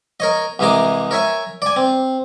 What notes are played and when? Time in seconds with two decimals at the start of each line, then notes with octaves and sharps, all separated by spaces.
0.20 A#4 C#5 D#5
0.59 C2 E3 G#3 G#4 A#5 D6
1.11 A#4 C#5 E5 G#5
1.62 D5 G#5
1.76 C4